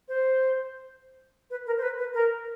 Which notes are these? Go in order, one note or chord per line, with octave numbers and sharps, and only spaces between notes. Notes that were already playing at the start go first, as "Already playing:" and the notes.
C5
B4
A#4
C5
B4
B4
A#4